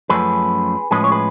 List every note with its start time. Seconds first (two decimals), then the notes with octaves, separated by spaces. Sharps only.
0.09 F#2 F3 A3 C#4 G#4 B4
0.91 A2 F3 G#3 C#4 G#4 B4
1.04 C#5
1.11 G#4 B4